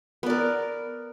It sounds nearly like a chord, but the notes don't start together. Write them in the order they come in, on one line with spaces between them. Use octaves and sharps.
B3 D5 A#4